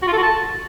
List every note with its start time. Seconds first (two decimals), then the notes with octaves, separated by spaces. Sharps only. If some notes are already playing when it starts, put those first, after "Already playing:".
0.03 F#4
0.08 F4
0.13 A4
0.18 F#4
0.23 A5